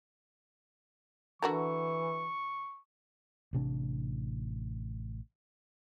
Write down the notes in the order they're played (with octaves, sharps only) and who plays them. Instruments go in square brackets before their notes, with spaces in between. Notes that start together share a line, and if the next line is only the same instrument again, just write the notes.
[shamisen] D3 F#4 A#4 [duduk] E3 [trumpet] C#6
[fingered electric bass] A1 C3 D4